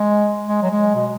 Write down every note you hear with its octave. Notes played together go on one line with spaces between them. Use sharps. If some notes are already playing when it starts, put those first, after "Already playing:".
Already playing: G#3
G#3
F#3
G#3
B2